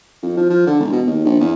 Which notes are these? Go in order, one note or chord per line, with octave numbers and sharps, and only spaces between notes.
F2
F3
F3
D3
E1
B2
D#2
A#1
E2